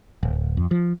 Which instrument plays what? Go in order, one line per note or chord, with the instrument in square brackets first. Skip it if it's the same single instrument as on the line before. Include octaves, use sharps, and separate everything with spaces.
[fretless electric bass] D1
F2
F3